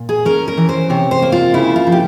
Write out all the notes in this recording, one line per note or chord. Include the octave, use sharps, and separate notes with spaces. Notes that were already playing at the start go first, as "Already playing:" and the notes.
Already playing: A#2
G#4
C#4 A#4
A#4
E3
C5
C3 C#5
C5
A#3
F4
C#3 E4
F4
F3
G4